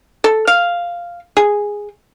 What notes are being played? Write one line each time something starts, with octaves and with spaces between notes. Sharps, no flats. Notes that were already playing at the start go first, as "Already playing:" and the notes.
A4
F5
G#4